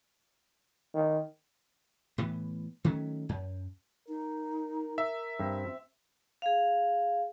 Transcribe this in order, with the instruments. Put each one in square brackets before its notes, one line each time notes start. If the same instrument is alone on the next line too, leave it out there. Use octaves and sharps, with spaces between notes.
[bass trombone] D#3
[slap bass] A2 E3 B3
D#3 F#3 A3 C#4
F#2
[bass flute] D#4 [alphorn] A#4
[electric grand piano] E5
[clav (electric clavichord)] G2 [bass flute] C4
[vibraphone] G#4 F5